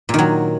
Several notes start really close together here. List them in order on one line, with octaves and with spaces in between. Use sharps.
A#2 D#3 F#3